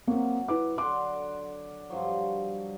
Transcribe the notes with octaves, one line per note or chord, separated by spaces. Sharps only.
F#3 A#3 C4
E4 B4 D6
D3 F#5 C6 D6
G2 F3 F#3